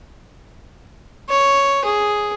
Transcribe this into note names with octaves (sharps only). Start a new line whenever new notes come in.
C#5
G#4